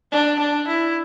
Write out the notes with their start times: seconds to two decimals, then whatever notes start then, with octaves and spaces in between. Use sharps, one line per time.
0.12 D4
0.40 D4
0.68 E4